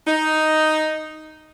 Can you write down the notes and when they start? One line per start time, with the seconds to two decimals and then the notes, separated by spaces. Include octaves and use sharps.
0.07 D#4